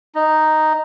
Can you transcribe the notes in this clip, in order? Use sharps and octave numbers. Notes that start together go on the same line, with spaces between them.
D#4